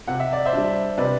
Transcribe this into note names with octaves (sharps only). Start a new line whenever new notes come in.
C3 F#5
E5
D5
C5 E5
G3 D4
C3 B4 D5